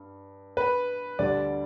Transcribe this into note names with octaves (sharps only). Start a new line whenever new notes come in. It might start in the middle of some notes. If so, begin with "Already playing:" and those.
Already playing: G2
B4
D2 D3 G3 D5